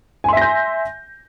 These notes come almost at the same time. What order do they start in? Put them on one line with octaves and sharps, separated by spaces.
G#5 C6 E5 A#6 G6